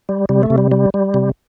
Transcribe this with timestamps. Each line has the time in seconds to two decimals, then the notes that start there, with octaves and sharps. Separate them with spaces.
0.09 G3
0.29 C3 G3
0.43 A3
0.50 C3
0.58 G3
0.72 G3
0.94 G3
1.14 C3